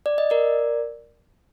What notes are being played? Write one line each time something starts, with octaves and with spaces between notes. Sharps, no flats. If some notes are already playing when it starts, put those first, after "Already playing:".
D5
D#5
A#4 D5